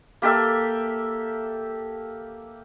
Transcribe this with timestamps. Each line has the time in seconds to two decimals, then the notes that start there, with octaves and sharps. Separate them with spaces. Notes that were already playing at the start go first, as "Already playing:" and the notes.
0.22 A#3 G4 A4 E5